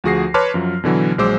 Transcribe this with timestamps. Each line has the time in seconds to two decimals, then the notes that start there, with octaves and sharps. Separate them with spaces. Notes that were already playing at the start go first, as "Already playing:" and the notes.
0.04 D2 F3 F#4 G#4 A#6 C7
0.34 B4 C#5 A5 C6 D6 F6
0.54 F#2 F3 F#3
0.84 B2 D3 E3 F#3
1.18 A#1 F#3 G#3 C5 D6 E6